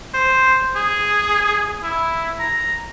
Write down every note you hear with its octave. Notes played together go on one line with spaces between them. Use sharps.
C5
G#4
E4
A#5